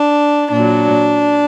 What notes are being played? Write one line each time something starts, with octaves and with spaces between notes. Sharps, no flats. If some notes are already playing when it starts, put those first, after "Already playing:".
Already playing: D4
A#2 F#3 D4